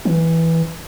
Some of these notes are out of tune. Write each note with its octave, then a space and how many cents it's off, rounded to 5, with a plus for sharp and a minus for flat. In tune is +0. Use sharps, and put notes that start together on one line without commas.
E3 -5